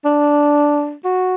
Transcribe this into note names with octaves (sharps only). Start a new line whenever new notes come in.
D4
F#4